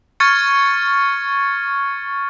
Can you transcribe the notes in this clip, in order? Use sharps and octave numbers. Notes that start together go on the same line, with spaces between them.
C#6 F6 G#6 A6 C#7